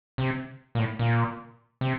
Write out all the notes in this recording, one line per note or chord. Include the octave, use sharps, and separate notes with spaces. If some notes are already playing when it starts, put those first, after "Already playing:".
C3
A#2
A2
A#2
C3